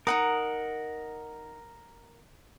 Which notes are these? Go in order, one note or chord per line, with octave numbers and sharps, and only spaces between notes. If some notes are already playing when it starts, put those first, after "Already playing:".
D#4 A#4 F#5 A#5 D#6